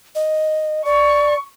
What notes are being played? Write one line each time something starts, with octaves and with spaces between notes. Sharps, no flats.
D#5
D5 C#6